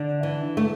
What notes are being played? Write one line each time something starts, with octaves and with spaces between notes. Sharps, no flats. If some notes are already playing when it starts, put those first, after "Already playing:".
Already playing: D3 D4
E3
A3